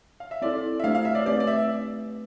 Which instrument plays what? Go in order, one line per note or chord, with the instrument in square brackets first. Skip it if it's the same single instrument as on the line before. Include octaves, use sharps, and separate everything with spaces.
[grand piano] F5
E5
[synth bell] C4 E4 A4 [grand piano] D5
[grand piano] E5
[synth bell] A3 D4 G4 C5 [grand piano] F5
[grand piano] F5
E5
D5
[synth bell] A3 C4 G4 B4 [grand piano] D5
[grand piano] D5
E5